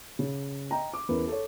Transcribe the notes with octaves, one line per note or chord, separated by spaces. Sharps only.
C#3
D#5 G5 A#5
D6
E2 C#4 E4 A#4 B4
A4 C#5